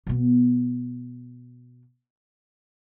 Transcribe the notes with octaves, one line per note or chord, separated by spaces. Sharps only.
B2 B3